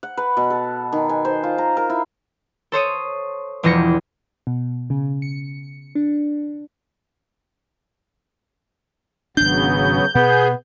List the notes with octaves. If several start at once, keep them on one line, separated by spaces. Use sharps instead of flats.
F#5
B4
B2
A4
D#3
G#5
C5
F4
A#5
A#4
E4
A4 C5 C#5 D#6
E1 E2 F3 A#6 C#7
B2
C#3
C#7
D4
G#1 C#3 F#3 B3 D4 G6
B2 B3 G#4